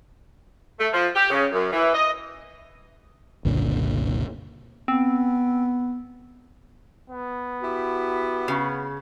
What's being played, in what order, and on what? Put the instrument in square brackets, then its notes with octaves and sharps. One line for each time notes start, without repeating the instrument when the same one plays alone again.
[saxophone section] A3
F3
G4
C#3
F#2
E3
D#5
[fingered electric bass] F#1 C2 A#2 D3
[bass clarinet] B3 [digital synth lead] C4
[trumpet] B3
[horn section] E4 F#4 G4
[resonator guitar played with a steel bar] C#3